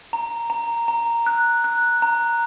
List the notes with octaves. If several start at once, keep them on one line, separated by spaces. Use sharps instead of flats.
A#5
A#5
A#5
F#6
F#6
A#5